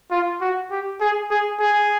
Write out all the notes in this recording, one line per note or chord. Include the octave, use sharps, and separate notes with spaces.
F4
F#4
G4
G#4
G#4
G#4